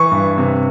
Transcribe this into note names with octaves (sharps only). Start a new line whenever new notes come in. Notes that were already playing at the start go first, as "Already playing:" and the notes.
Already playing: E3 C#6
G2
C3